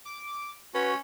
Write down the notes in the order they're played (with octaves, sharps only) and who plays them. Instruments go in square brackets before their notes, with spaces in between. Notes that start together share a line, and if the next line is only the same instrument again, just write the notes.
[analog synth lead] D6
[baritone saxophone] C#4 [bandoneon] F#4 [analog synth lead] B4